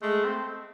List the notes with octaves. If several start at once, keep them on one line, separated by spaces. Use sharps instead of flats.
G#3 A3
C4